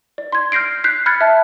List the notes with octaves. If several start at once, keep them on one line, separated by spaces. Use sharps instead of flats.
D5
C6 G#6
F6 G6 A#6 C7 D7
F#6 G6 B6 C7
B5 F6 F#6 G#6 A6 C#7
E5 A5